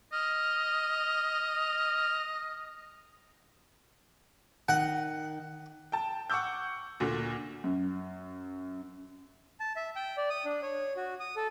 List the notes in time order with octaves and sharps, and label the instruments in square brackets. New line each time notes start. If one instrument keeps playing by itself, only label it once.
[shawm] D#5 [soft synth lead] F6
[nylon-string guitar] D#3 [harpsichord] F#5
[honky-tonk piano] G5 A5
F#5 C#6 D6 E6 G6
D2 A#2 D3
[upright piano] F#2
[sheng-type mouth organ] A5
E5
G5
D5
D#6
D4
C#5
F#4
D#6
A4